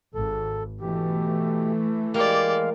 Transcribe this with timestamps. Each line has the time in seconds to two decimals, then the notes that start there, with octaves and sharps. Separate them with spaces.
0.15 G#1 A4
0.81 B2 E3 A3 G4
2.14 G#3 A#3 G4 D5 F5